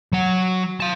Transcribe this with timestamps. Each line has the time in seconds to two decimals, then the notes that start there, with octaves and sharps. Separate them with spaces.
0.13 F#3 F#5
0.80 F5 A5